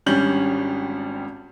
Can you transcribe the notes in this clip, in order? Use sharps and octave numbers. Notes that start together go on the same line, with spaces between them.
G#1 G3 C#4 D4 G6 F#7